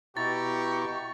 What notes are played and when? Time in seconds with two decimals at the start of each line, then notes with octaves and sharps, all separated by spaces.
0.17 B2 E4 G4 A#5 C#6 A6